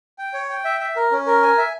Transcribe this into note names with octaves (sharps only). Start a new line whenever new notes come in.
G5
C#5
G5
E5
E5
A#4
C#4
A#4
G#5
E5